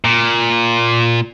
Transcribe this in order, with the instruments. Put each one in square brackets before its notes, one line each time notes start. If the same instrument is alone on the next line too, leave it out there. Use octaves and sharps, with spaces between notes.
[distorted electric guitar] A#2